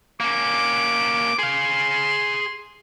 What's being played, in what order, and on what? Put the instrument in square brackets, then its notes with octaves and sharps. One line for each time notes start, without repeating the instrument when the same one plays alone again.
[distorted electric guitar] A#3 C#4 [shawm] D6
[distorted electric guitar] G#4 F5 [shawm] C6